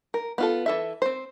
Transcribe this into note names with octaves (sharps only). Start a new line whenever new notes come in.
A#4
B3 F4 A4
E3 A4 E5
C4 C5